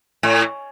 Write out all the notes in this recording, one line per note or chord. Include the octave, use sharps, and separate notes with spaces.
A2